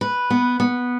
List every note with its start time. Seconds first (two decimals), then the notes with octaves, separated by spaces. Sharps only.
0.01 B4
0.30 B3
0.60 B3